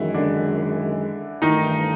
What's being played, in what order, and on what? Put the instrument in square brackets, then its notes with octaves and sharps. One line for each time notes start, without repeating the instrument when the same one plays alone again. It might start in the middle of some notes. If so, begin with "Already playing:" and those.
Already playing: [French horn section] F#2 D#3 G#3 [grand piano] E3 E4
[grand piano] D3 D4
[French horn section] G2 E3 A3 [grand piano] D#3 D#4